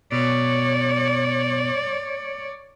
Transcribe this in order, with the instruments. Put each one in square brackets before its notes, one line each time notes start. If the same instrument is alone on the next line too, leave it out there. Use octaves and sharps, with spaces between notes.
[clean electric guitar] B2 [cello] C#5 D5